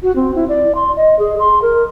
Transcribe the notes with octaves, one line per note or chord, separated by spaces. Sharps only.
F#4
C4
E4
D5
C6
D#5
G#4
C6
A#4